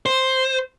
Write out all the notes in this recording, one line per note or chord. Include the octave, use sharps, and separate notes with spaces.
C5